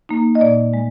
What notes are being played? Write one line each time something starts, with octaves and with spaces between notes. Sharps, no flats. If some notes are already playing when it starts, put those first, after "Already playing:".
A#3 D#4
D#5
A#2 D5
G#3